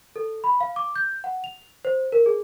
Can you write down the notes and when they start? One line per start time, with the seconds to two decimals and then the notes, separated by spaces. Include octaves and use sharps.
0.16 A4
0.44 B5
0.61 F5
0.76 D6
0.96 G6
1.24 F#5
1.44 F7
1.85 C5
2.12 A#4
2.26 G#4